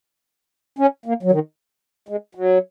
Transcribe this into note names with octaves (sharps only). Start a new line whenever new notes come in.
C#4
A#3
F#3
D#3
G#3
F#3